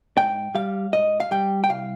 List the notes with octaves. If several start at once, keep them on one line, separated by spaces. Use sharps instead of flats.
G#2 G5
G3 F5
G#2 D#5
F5
G3 G5
G5
C2 F5